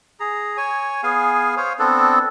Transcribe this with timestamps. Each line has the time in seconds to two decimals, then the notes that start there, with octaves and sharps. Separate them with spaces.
0.20 G#4 A#5
0.57 C#5 G#5
1.03 B3 G#4 F5 G#5
1.57 C5 C#5 F5
1.79 B3 C4 D4 A4